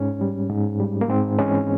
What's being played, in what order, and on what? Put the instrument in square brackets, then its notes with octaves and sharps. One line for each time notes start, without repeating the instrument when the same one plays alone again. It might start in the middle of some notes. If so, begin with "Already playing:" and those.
Already playing: [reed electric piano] G#2 C#4
G3
G#2
G3
A#3
G#2 C4
E3 G#3 C#4